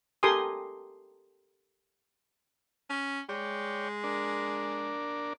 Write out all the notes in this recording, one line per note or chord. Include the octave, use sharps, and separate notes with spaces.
G4 A4 A#4 G#5 C6 D#6
C#4
G#3 C#5 D5 G5
D4 A#4 D5